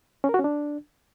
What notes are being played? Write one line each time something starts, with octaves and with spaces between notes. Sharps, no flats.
C#4
A#4
F#4
C#4
D4